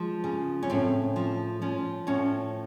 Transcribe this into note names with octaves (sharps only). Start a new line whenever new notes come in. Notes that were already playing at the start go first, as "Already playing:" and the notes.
Already playing: F3 G#3
C#3
C#4
A2 C4
F3
F3 C#4
A2 C#4